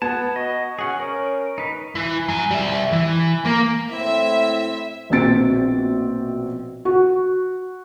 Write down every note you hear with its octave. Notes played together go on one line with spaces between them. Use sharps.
B3 B4 A5 G#6
F#4 D#5
C#4 G#4 F#5
C#4 A#4 C#5
D7
D#4 B4
E3
F#3 G#5
G3 E5
E3
A#3 A#4
A2 C4 E4 E5
A#1 B2 C4 A6 D7
F#4